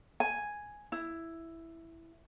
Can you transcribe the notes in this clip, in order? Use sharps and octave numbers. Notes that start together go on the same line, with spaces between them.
G#5
E4